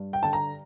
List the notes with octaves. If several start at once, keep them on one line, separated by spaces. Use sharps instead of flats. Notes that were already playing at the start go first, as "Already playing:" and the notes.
Already playing: G2
G5
D3 A5
A#5